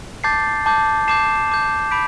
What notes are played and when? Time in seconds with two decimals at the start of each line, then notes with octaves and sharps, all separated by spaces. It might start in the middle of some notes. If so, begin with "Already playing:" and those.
0.24 A5 D6 G6 A6 C7
0.66 A5 D6 G6
1.08 A5 D6 G6 C7 E7
1.50 A5 D6 G6
1.91 B5 D6 G6 B6 D7